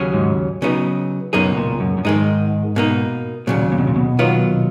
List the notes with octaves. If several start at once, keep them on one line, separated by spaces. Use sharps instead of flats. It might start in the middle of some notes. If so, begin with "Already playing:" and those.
Already playing: D#2 C#3 F#3 C#4 G#4
G#2
C#3 F#3 B3 D#4
C#2 F#2 B2 A#3 D#4 G#4
A#2
F#2
F#2
G#2 D#3 G#3 D#4
B2 A#3 D#4
D#2 A#2 C#3 F#3
A#2
B2
A#2
B2
D#2 D#3 F#3 B3 F4